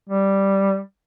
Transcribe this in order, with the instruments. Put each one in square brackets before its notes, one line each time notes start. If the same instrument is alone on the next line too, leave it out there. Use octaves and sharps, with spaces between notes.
[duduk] G3